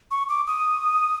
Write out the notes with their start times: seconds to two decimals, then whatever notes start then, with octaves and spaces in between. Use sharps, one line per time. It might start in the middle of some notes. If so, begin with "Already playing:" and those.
0.11 C#6
0.29 D6
0.47 D#6